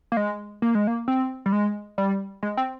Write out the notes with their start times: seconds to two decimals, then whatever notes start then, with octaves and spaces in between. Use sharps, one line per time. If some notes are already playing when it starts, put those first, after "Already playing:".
0.12 A#3
0.17 G#3
0.62 A#3
0.75 G#3
0.87 A#3
1.08 C4
1.46 G3
1.52 G#3
1.98 G3
2.43 G#3
2.57 C4